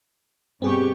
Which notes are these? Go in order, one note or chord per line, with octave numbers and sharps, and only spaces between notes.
G2 B2 B3 C4 G4 G#4 C#6